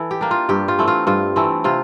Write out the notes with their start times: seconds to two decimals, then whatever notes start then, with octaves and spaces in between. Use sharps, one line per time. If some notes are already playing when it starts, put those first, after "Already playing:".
Already playing: E3 A4
0.11 G4
0.21 A#3 D4
0.31 F4
0.49 G2 G4
0.68 F4
0.78 E3 A3 C4
0.88 F4
1.07 G2 F4
1.36 E3 A3 C4
1.64 C3 F4